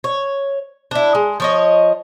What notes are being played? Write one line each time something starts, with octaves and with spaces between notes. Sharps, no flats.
C#5
D4 E4
G#3
F3 C#5 D#5